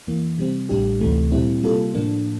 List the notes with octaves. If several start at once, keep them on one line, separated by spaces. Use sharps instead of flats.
F2 E3 A#3
C3 G3 C4
A1 A2 G3 D4 G4
D2 C3 E3 A3
A#2 G3 C4 E4
C3 G3 A#3 F4 A4
A2 F3 A#3 D4